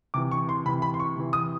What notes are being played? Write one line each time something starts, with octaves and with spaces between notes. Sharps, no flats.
C3 E3 D6
C#6
C6
C3 E3 B5
B5
C6
C#6
C3 E3
D#6